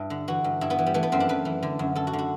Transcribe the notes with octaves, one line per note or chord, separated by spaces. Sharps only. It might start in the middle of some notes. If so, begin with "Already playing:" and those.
Already playing: G2 D4 E4
D3
E3 F#4
G2
G2 E4
B3
E3
G3
E3 A3
B3
F#2 C4
D4
F#2 B4
E3
D3
F#2
F#2 A4
F#4
D3
F#4